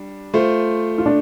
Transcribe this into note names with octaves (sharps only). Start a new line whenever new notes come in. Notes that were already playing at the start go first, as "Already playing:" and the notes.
Already playing: G3 D4
A3 F4 C5
F4
D4